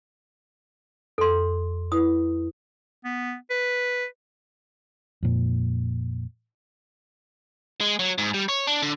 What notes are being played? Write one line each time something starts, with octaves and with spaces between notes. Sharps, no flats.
F2 A4 C6
E4 B4 D#6
B3
B4
F2 A#2
G#3
F#3
G#2
G3
C#5
D4
D3